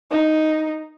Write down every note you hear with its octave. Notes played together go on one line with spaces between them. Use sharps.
D#4